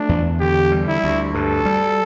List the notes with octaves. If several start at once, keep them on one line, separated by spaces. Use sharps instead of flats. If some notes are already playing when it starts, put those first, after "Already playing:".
Already playing: A3 D4
E2
D3 G4
G3
E4
D2
G2 A4
G3